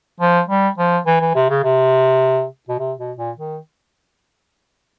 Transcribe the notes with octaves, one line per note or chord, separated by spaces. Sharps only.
F3
G3
F3
E3
E3
C3
C#3
C3
B2
C3
B2
A#2
D#3